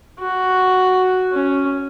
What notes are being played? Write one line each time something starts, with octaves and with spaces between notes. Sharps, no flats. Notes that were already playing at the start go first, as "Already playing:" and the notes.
F#4
C#4